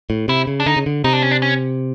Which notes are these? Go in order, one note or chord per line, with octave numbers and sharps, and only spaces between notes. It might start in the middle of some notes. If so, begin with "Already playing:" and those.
A2
C3 E4
C#3
D4
D3 D#4
C#3
D3
C3 D#4
D4
C#4
D4
C#4